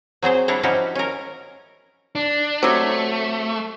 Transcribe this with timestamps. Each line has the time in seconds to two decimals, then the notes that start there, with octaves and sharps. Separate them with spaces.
0.22 F#3 C4 G#4 C5
0.48 G3 D4 E4 C#5
0.63 F3 C#4 D#4 E4 F#4 G4
0.95 C#4 A#4
2.15 D4
2.63 C3 F#3 A3